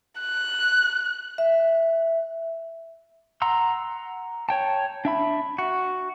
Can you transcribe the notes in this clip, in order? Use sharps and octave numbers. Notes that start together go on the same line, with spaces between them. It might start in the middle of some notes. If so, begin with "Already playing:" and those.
F#6
E5
F#5 A#5 C6 E6
C#5 G5 A5
D4 E5 B5
F#4